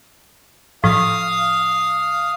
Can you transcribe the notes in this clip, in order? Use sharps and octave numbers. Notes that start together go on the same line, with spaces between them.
A2 F3 F5 D#6